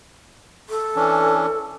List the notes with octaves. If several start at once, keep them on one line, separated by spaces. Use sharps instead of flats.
A4
E3 C#4 D4